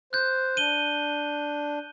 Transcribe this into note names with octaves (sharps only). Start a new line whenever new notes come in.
C5 F#6 G6
D4 D#7 G7